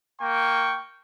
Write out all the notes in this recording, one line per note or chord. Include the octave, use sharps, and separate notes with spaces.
A#3 G5 C#6